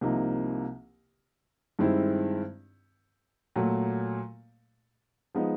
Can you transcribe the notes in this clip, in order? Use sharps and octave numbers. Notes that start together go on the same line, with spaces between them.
C2 C3 F3 A#3 D#4
G2 D#3 G#3 C4 E4
A#2 F#3 A3
F3 G#3 B3 D#4